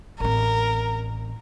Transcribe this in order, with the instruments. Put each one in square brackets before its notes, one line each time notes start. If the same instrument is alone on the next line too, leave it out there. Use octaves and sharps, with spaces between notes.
[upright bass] A1 C4 [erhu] A#4